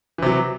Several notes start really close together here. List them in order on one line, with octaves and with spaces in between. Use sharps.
E3 C3 F#3